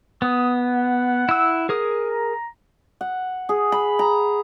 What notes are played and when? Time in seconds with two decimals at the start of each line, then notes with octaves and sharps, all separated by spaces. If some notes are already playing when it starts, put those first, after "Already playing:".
0.22 B3 D#6
0.59 F#5
1.29 E4 E6
1.69 G#4 A#4 D#6
2.09 A#5
3.01 F#5
3.49 G#4
3.72 B5
3.99 A#5